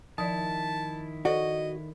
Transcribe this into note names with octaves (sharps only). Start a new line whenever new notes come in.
D#3 F3 E4 D5 A5
F#4 A4 C5 D5 D#5